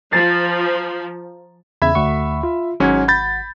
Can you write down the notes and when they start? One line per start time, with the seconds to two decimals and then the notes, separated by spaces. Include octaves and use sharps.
0.12 F3 A#5 A6 C7
1.82 E2 C#3 E5 B5 G#6
1.95 D2 F#5 C#6
2.43 F4
2.80 G#1 G#2 F#3 C#4 F#5 G#6
3.08 B5 G6 A6